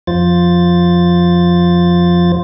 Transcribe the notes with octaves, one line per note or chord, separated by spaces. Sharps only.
F2 F3 F4 C5 A6